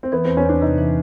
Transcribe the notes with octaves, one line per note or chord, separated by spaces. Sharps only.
C4
E3 B3
E2 C4
C#4
E2 D4
C3 D#4
E3